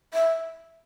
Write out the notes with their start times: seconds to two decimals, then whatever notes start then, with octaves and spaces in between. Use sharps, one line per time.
0.14 E5